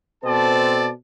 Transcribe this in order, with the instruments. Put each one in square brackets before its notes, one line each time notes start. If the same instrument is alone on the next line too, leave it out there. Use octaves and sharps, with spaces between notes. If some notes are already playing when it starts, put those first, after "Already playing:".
[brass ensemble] B2 C4 A4 C5 D5 A5